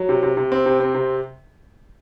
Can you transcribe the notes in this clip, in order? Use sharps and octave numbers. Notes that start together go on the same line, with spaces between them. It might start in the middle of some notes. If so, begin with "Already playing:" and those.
Already playing: F#3
C3
C3
C3
C4
C3
C4
C3